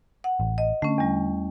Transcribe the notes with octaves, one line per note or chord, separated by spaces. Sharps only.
F#5
A1
D#5
D3 A3 C#4
E2 G3